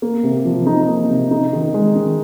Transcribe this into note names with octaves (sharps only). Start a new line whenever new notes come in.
A#3
C3
F3
D#4
A#3
C3
D#4
D#3
G#3
D#3